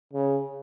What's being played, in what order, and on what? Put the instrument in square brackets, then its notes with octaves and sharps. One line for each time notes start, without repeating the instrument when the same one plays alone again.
[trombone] C#3